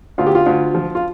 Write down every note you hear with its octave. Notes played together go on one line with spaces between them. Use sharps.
D2 F4
G4
F4
D2
F3
F4